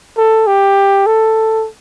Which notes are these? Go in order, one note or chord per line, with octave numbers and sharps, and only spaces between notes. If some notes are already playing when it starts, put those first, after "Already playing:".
A4
G4
A4